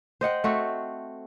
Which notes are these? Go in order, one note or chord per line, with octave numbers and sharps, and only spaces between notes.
C5 D#5 F#5 G5
A3 C4 F#4